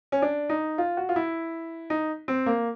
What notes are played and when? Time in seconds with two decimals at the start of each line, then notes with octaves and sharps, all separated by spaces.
0.12 C#4
0.22 D4
0.49 D#4
0.78 F4
0.97 F#4
1.09 F4
1.16 E4
1.90 D#4
2.28 C4
2.46 A#3